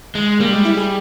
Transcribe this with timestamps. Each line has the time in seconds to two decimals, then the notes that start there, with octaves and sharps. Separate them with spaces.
0.15 G#3
0.40 G3 A#3
0.53 G#3
0.65 E4
0.77 G#4